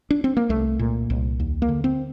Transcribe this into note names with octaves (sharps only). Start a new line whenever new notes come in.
D4
C4
A#3
C2 A3
A#2
C2
D#2
A#3
D3
C4